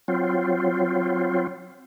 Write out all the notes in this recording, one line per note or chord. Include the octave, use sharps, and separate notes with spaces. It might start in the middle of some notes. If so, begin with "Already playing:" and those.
F#3 C4 F4